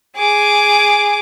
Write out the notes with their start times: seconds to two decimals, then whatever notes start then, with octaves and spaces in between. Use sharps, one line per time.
0.16 G#4 D6